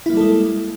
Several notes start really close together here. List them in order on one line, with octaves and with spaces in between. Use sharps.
E4 A#3 G3 A4 G#3